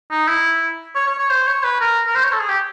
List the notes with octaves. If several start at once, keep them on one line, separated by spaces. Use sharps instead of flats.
D#4
E4
C#5
C#5
C#5
C5
C#5
B4
A#4
A#4
C5
C#5
A4
G#4
G4